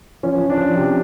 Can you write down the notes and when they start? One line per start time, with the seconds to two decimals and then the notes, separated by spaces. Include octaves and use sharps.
0.23 F3 C#4
0.41 F3
0.50 D4
0.58 F3
0.76 C3